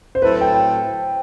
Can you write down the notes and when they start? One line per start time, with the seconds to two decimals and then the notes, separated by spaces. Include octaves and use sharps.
0.15 C5
0.22 A2 F#3 C4 E4 A4 B4
0.41 G5